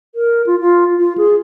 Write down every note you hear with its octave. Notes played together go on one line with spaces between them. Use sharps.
A#4
F4
F4
F4
G#4